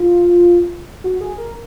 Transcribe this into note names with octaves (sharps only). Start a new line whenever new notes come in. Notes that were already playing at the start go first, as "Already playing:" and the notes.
Already playing: F4
F#4
G#4
A#4